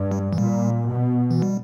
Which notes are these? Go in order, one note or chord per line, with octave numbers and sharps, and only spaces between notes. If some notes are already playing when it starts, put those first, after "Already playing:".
Already playing: G2
G3
E3
A#2 G3
B2
E3
G3